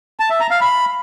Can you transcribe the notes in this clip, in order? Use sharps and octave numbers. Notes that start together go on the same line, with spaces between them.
A5
E5
A#5
F5
B5